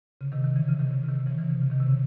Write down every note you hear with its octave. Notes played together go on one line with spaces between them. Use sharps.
C#3
C3 D#3
C3 D#3
C#3 E3
C#3
C3 D#3
C#3
C#3
C3 D#3
C#3 E3
C#3 E3
C3
C#3
C3 D#3
C3
C#3